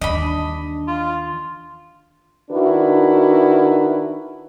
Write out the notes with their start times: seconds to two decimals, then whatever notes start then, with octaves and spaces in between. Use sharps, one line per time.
0.02 D#2 E3 D4 D#5 B5
0.88 F4
2.51 D#3 D4 E4 F#4 B4